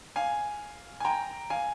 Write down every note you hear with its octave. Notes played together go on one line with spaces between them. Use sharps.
F5 G#5
G#5
G5 A#5
F5 G#5